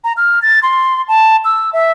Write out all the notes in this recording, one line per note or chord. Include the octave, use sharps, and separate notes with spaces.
A#5
F6
A6
C6
A5
E6
E5